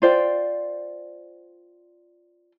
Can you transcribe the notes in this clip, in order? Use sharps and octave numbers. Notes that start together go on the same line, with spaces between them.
F4 C5 D5 G5